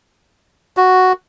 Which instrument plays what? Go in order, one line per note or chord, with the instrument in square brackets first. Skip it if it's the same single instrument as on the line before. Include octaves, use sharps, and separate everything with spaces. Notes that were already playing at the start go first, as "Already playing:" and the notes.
[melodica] F#4